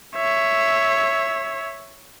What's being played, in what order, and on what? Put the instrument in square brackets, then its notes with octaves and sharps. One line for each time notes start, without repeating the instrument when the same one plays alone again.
[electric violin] C#5 E5